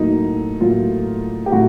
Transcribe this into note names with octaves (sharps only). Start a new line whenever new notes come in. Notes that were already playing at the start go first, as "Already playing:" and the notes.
Already playing: A2 F#3 A#3 D#4
A2 F#3 A#3 F4
G4
A2 F#3 F#4